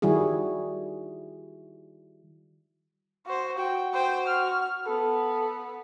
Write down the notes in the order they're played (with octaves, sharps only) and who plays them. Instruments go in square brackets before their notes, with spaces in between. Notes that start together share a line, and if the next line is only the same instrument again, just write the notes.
[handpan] D#3 G3 E4 F#4 G#4
[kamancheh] F#4 C5
[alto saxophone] F#4 [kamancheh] G5
[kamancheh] C5 G5
F6
[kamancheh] B3 [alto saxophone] A4